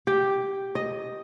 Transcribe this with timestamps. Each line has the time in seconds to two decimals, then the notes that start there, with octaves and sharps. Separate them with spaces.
0.07 G4
0.75 D#5